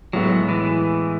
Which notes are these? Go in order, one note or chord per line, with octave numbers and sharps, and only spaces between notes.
A2 F#3 G#3 B3
E3